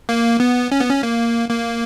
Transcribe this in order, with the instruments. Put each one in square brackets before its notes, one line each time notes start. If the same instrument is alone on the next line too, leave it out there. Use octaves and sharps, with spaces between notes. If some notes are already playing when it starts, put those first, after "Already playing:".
[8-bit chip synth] A#3
B3
C#4
B3
C#4
A#3
A#3